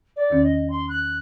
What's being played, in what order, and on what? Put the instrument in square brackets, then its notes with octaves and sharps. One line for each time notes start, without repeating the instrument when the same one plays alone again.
[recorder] D5
[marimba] E2 D#3 C#4
[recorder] D#5
C6
F#6